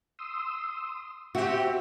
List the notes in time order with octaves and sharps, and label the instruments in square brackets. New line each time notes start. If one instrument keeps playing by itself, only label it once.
[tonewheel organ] C6 D#6 E6
[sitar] B2 C4 G4 [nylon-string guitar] F#4 [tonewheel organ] E5